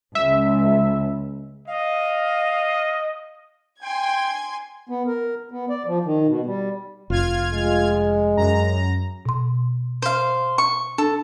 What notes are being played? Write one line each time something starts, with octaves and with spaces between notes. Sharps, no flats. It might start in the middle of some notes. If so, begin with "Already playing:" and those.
C#2 E5
D#5 F5
G5 G#5 C6 G#6
B3
A#4
B3
D5
F3
D#3
B2
G3
F1 F4 F6 G#6
G#3
F#2 A#5
B2 C6
C5 F5
C#6
D4 A4